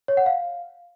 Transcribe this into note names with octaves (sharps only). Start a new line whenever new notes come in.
C#5
F#5
F5